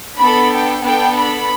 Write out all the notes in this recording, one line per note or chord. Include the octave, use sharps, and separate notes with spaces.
B3 D4 A4 B5
G5
B3 D4 A4 G5
B5